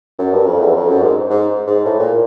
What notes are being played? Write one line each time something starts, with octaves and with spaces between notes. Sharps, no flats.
F#2
G2
F2
E2
F2
F#2
G#2
G#2
G#2
A2
A#2